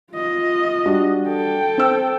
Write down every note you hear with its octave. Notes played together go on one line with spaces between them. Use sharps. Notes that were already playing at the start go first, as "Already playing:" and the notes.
F4 D#5
G3 D4 F#4
A4 G5
C4 E6